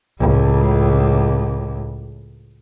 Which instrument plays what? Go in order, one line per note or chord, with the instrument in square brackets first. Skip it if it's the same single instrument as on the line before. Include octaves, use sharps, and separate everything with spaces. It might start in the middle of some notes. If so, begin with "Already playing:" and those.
[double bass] C#2 A2